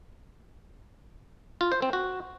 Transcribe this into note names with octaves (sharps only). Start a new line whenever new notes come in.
F4
C5
C4
F#4